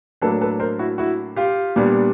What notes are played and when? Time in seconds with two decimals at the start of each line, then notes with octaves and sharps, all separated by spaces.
0.22 A2 F#3 A#3 D4 A4 B4
0.41 A4 B4
0.60 A#4 C5
0.79 E4 F#4
0.98 E4 F#4
1.36 F4 G4
1.76 A#2 G3 B3 D4